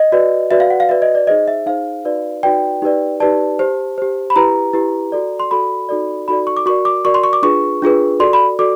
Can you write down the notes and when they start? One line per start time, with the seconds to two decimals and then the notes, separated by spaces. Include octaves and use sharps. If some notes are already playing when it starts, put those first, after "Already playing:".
Already playing: D#5
0.12 F#4 B4 D5
0.51 F#4 B4 D5 E5
0.60 F5
0.70 F#5
0.80 F5
0.89 F#4 B4 D5 E5
1.02 D#5
1.15 D5
1.27 D#4 G#4 C5 D#5
1.48 E5
1.66 D#4 G#4 C5 F5
2.05 D#4 F#4 B4 D5
2.43 D#4 F#4 B4 D5 G5
2.82 D#4 G4 B4 D5
3.20 D#4 G4 B4 D5 A5
3.59 G4 C5
3.98 G4 C5
4.30 B5
4.36 E4 G4 B4 A#5
4.73 E4 G4 B4
5.12 F#4 A4 D5
5.40 C6
5.51 F#4 A4 D5 B5
5.89 D#4 F#4 A4 D5
6.28 D#4 F#4 A4 D5 B5
6.47 C#6
6.57 D6
6.66 F#4 A#4 D5 C#6
6.85 D6
7.05 F#4 A#4 D5 C#6
7.14 C6
7.23 C#6
7.33 D6
7.43 D4 F4 G#4 B4 C#6
7.82 D4 F4 G#4 B4
8.20 F#4 A4 D5 C6
8.33 B5
8.59 F#4 A4 D5 D6